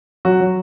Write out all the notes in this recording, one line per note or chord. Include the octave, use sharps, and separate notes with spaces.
F#3 F#4
F#3